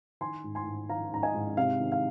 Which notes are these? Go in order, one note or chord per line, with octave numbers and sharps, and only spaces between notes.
D#3 G#5 C6
G#2
G#5 C6
G#2
D#3 F5 A#5
G#2 A#5
D#5 G#5
G#2
C3 F5
D#3
F5